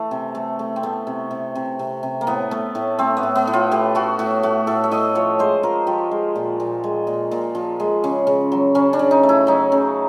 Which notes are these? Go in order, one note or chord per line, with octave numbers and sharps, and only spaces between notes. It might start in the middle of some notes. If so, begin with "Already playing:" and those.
Already playing: E3 A3
C3
A3
A3
C4
A3 B3
C3
C3
C3
C3
C3
A#3
A2 B3
A3 B3
A2
A3 C4
B3
A2
B3
A2
F4
A2 G4
A3 F#4
A2 F#4
A3 F#4
A2 A4
E5
A2 D#5
F3 C#5
G#3 C5
F3 A#4
F3 G4
G#3
A#2
A#2
G#3
A#2
A#2
F3
G#3
C#3
C#3
F#3
C#3 C#4
D4
C#3
D#4
A3
E4
F#3 D#4
C#3